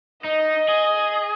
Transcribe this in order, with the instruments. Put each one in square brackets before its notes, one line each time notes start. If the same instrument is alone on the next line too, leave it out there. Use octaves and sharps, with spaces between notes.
[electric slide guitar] D#4 [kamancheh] D#5
[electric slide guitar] G#4